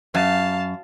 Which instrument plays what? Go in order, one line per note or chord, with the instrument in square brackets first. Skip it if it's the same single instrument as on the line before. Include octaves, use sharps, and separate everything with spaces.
[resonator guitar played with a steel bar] F#2 [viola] F5 A5